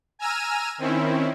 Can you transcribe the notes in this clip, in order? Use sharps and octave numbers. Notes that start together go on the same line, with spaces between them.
G#5 A#5 E6 F6 D#7
D#3 C4 C#4 E4